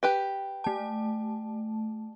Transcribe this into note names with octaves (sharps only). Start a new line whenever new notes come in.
G4 B4 G5
A3 A5